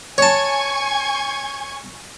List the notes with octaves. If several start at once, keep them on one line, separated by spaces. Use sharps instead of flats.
C#5 G#5 A5 C#6 G#6